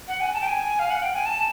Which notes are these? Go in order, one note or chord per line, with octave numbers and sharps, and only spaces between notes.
F#5
G#5
A5
G5
G#5
F5
F#5
G5
G#5
A5